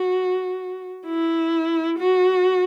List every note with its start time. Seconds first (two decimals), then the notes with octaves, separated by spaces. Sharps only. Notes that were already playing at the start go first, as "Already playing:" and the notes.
Already playing: F#4
1.06 E4
1.99 F#4